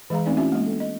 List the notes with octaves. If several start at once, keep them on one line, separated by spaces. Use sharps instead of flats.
E3 G#3 G#4 F5 A#5
A3 C4 C#4 D#4 D5
C#4 E4 F#4 E5
G#3 A#3
B3 A4
D#5